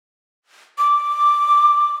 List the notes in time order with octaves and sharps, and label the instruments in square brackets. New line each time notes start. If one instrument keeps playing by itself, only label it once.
[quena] D6